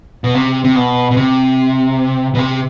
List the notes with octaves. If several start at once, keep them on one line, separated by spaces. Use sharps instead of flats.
B2
C3
C3
B2
B2
C3
B2
C3